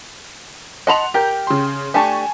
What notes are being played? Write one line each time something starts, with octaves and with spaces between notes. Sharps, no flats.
D#5 F#5 A5 B5 C6 F7
G4 A#4 G6
C#3 C6
A3 D4 G4 G#5 A5 C#6